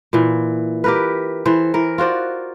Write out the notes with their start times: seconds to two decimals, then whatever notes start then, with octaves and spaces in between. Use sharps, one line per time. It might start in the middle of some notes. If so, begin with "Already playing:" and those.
0.13 A#2 E3
0.84 G4 A#4 B4
1.46 E3 A4 C5
1.74 E3 A#4
1.98 F4 F#4 C5 D5